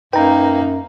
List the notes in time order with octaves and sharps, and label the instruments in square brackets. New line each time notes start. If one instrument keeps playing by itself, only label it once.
[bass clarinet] F#2 [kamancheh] A#3 D#4 [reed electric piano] B4 A#5 [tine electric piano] G5